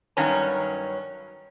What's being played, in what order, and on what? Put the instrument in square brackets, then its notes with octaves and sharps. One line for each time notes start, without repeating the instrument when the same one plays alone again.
[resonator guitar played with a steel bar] G2 D#3 F#3 C#4 A#5